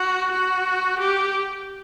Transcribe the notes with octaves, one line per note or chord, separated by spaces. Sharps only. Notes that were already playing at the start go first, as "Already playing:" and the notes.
Already playing: F#4
F#4
G4